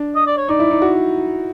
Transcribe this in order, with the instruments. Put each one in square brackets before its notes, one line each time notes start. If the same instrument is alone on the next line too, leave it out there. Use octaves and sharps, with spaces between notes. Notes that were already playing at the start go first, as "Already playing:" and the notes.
Already playing: [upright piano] D4
[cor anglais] D#5
D5
C#5
[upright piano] D#4 [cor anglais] D5
[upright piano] E4
D#4
F#4